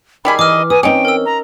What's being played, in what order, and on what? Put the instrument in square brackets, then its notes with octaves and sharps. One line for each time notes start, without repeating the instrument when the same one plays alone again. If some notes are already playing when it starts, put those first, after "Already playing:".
[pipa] D#3 G3 G#4 [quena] B5
[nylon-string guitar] E3 [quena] D#5 [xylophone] D6 F6
[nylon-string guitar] B4 [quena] G#5 [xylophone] D#6
[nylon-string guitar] C4 C#5 [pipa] C#4 D#4 [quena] G5
[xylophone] A#4 E6
[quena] A#5